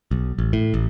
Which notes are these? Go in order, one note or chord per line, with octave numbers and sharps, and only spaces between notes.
B1
A1
A2
A1